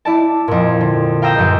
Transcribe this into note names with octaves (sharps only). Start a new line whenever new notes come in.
E4 D5 A5
F2 A#2
D3
F5 G5 A#5 D#6 E6 G6
C#2 F#2